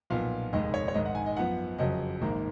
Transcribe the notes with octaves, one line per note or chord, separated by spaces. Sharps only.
B1 A#2 F3 B3 F5
F1 D#2 D#3 G#3 D#5
C#5
C#5
A#1 G#2 D#3 D#5
F#5
G#5
D#5
F#2 F3 B3 F#5
F#1 F2 C#3 F#3 D#5
A#1 G#2 D#3 A#3